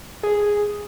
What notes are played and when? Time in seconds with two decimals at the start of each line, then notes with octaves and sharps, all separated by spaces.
0.23 G#4